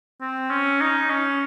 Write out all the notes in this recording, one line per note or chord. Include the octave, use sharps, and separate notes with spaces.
C4
C#4
D#4
C#4